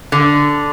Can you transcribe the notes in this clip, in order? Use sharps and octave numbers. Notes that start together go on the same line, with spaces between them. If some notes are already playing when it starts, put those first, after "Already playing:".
D3